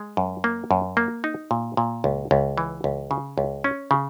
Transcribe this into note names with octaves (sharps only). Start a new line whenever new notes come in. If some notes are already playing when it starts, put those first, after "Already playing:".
Already playing: G#3
F#2
A#3
F#2
A#3
D#4
A#2
A#2
C#2
C#2
E3
C#2
C#3
C#2
C#4
C#3